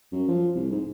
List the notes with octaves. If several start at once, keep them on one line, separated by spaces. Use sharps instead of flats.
F#2
F3
C2
G#2